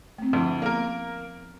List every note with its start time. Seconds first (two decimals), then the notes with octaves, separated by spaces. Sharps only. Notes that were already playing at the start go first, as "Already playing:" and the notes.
0.18 A3 C4
0.33 D2 F3 E4
0.62 A#3 B3 A#4